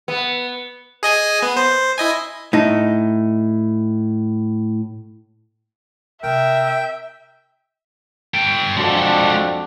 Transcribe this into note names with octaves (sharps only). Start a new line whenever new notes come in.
B3
G#4 D#5 G#5
B3
C5
E4 D#5 G#5
A2 D#4
C3 A#4 E5 G5
A4 G5
F2 G#3 D4 F#4 A4